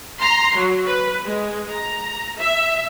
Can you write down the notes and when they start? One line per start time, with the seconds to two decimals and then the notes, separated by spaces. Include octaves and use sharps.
0.19 A#5 C6
0.56 F#3
0.86 B4
1.24 G#3
1.70 A#5
2.39 E5